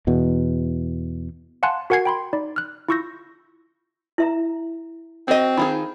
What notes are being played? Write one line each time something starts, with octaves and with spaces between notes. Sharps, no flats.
E2 B2
F5 F#5 G#5 A5 C6 F#6
F#4 A#4 F#5 G#5 G#6 C7
G5 B5 C6
D#4 D5 B5
F6 F#6
E4 F4 C#6 E6 G6 A#6
E4 E5 A#5
C4 F#4 D#5
D#3 D#4 F4 G#4 B5